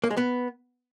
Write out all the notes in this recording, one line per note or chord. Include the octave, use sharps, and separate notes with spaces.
A#3
G#3
B3